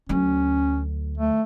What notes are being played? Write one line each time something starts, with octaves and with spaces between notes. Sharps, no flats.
D2 F#3 C#4
A3